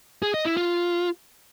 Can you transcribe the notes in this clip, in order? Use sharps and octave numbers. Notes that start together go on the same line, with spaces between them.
G#4
D#5
E4
F4